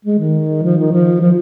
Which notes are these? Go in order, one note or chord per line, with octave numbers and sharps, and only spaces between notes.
G#3
D#3
F3
D#3
F3
F3